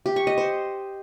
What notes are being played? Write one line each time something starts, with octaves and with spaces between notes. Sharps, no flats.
G4
C#6
D#5
C5